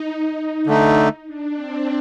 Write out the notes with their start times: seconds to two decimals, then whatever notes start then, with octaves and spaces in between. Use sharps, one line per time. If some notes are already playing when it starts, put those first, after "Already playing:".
Already playing: D#4
0.67 D3 A3 D#4
1.27 D4
1.57 C4